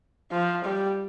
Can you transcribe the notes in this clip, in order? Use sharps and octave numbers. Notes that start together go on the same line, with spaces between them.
F3
G3